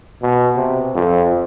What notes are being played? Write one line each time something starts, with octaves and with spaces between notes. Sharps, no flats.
B2
C3
F2